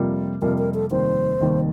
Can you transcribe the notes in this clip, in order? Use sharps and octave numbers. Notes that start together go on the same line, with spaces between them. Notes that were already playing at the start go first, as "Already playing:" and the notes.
Already playing: F2 C3 G3 A#3 F4
F2 C3 G3 A#3 F4 A#4
A#4
A4
F1 D#2 D#3 G3 A#3 C5
F1 D#2 D#3 G3 A#3